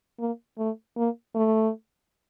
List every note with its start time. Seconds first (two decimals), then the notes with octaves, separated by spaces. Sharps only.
0.19 A#3
0.58 A3
0.97 A#3
1.35 A3